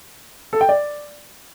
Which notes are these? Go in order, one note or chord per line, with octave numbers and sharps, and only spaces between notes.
A4
G5
D5